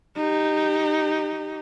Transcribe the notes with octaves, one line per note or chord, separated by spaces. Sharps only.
D#4 G4